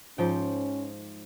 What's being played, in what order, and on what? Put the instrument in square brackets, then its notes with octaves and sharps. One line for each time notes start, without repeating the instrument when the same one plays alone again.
[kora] G#2 F3 G5 [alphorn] C#4